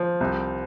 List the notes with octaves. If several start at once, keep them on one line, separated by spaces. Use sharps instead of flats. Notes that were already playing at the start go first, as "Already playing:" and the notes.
Already playing: F3
C2